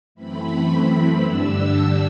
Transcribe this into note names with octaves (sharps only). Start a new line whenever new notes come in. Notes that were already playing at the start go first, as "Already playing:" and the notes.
F#2 E3 A3 C4 B5
G2 D3 G3 D4 E6
E6